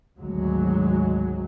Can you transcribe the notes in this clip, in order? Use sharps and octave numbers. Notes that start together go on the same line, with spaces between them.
G#1 D2 F#3 G#3